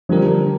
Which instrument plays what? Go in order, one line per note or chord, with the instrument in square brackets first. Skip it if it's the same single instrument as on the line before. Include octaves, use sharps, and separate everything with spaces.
[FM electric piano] D3 G3 D4 G4 A#4 [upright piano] F3